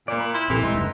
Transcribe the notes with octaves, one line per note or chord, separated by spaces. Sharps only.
A#2 A#3 D5
B5
E4 C6
A#2 E3 F3 C4 G4 A4
D1 G#3 D#4 E5 C6
F#2 C#3 G#3 D#4 B4